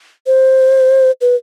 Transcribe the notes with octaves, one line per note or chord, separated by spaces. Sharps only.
C5
B4